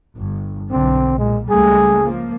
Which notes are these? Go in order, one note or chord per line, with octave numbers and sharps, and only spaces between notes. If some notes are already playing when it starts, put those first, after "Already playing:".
G1
B1 D3 C4
A#2 G#3
C#2 G3 A3 G#4
F3 A#3